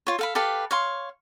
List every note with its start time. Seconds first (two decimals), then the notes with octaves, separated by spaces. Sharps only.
0.07 F4 C#5
0.19 A4 F5 B5
0.35 G4 A4 B4 F5
0.71 C#5 F5 C6